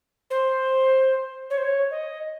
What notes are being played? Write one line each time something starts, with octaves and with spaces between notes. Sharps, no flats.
C5
C#5
C5
C#5
D#5